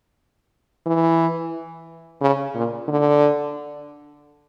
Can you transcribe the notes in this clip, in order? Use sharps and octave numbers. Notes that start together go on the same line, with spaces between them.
E3
C#3
A#2
D3